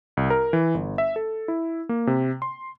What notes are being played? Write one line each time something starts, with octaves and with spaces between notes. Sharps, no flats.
C2
A#4
E3
G1
E5
A4
E4
A#3
C3
C6